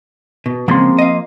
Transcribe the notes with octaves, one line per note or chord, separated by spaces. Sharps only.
B2
C#3 F3 G#3 A#3 C4 C6
D#5 F5